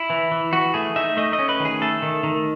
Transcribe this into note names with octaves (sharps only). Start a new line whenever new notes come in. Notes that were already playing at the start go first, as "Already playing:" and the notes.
Already playing: E4
E3
E3
E3 F#4
A3 G#4
D#4 E5
A3 D#5
D#5
C#4
B4
D#3
G#4
A3 A4
D#3
D#3